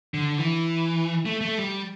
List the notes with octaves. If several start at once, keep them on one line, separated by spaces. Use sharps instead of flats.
D3
E3
A3
A3
G3